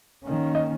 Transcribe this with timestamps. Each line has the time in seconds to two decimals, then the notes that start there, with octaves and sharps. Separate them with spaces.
0.23 D#3 A#3 C#4
0.55 D#5